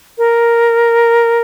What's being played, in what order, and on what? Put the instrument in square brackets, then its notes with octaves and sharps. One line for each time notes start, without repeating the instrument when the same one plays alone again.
[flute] A#4